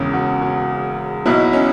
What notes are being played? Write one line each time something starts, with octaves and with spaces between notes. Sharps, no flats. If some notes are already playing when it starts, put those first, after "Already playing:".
Already playing: E1 E2 C#3 C#4
F#4
F#4
B1 B2 F#3 E4
C#4